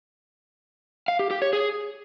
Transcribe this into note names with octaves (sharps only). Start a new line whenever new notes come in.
F5
G4
G4
C#5
G#4